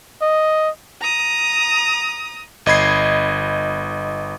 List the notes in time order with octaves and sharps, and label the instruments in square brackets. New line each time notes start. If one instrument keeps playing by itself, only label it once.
[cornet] D#5
[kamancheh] A#5 D#6
[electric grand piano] G1 D#5 B5 G#6 C7